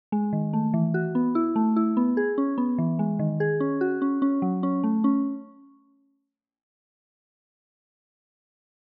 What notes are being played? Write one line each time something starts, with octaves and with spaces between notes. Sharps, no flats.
G#3
D#3
A3
E3
F#4
B3
E4
A3
E4
B3
G#4
C#4
B3
E3
G#3
D#3
G#4
C#4
F#4
C#4
C#4
F#3
C#4
A3
C#4